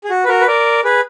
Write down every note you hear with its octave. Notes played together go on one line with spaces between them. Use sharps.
G#4
F#4
B4
F#4 A#4
B4
A#4 D5
G#4 B4